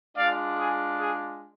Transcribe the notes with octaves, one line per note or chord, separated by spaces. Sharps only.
G#3 D4 F4 D5 F5
G#4
G#4